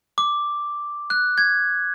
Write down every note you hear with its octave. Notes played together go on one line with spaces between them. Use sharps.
D6
F#6
G#6